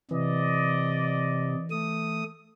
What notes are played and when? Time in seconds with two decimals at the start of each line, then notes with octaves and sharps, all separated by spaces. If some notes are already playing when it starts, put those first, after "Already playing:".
0.11 C3 E3 D5 D#5
1.71 A3 D#6